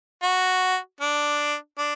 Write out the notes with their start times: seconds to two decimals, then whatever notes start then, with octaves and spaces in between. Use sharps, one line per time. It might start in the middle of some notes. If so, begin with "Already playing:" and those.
0.23 F#4
1.01 D4
1.78 D4